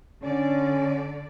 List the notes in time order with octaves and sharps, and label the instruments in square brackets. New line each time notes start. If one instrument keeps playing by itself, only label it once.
[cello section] D3 D5 [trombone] C#4